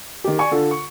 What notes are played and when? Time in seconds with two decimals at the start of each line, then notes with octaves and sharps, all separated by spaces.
0.24 D#3 G4
0.39 D5 G#5 C#6
0.51 D3 F4 A4
0.71 C#6